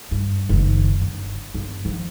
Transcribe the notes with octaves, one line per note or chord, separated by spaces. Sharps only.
G2
F#1 D#3
G1
G1
F3